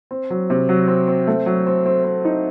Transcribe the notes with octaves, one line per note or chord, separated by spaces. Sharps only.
C4
F#3
C3
F#3
C4
C4
A3
F#3
C4
C4
C4
D#4